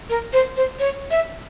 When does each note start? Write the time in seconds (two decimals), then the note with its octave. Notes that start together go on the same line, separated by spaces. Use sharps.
0.10 A#4
0.33 C5
0.56 C5
0.80 C#5
1.11 E5